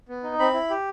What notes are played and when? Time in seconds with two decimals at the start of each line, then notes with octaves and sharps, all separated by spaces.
0.09 B3
0.23 D#4
0.39 C4 B5
0.54 E4
0.70 G4